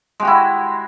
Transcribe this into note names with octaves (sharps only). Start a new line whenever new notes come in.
G#3 E4 F#4 G4